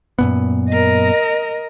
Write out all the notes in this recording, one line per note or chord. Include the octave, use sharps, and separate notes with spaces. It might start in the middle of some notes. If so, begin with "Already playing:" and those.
F#2 A#2 B3
A#4 D#5